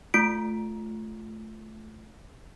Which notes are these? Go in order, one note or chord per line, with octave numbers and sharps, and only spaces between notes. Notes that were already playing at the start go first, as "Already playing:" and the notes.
A3 F4 D7